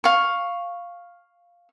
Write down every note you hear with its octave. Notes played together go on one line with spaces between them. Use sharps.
F5 C#6